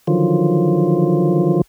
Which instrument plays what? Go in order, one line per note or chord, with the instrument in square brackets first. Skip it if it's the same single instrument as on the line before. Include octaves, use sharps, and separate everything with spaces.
[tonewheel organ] D3 D#3 F3 F#3 F4